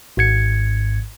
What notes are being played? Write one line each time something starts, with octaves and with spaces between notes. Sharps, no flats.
G#1 G#2 G#6 C#7